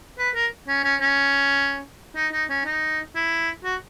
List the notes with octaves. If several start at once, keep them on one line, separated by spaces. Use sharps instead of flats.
B4
A#4
C#4
C#4
C#4
D#4
D#4
C#4
D#4
E4
F#4